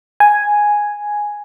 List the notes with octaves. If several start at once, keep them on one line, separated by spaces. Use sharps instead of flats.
G#5